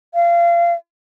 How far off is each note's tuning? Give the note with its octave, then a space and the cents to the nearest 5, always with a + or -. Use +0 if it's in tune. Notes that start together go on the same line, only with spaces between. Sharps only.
F5 -30